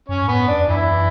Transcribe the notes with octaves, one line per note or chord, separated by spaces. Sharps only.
F#2 C#4 C#5
A2 B3 B4
F#2
D4
E2
F#2 E3 E4